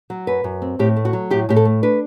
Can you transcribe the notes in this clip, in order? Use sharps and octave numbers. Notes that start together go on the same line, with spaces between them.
F#3
F#2 B4
F#2
C4
A2 G4
A3
F#4
F#3
A2 G4
A2 G4
A4
A3
D4 B4